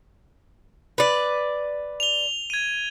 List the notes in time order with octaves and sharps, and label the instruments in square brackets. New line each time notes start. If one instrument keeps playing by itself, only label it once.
[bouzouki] B4 D5
[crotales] F7 G7
G#6 D#7